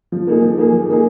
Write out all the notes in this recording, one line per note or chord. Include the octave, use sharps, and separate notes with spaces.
F3
A#3 D#4 G#4
F3
A#3 D#4 G#4
F3
A#3 D#4 G#4